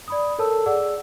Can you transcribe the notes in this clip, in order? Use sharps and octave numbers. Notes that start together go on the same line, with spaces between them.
D5 B5 D#6
A4 A#4 C#5 A5 E6
G#4 D5 F#5 E6